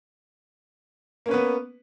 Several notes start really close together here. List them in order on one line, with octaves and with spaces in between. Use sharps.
A#3 C#4 B4 B3